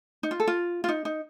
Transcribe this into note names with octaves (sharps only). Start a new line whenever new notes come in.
D#4
F4
A4
F4
F4
D#4
D#4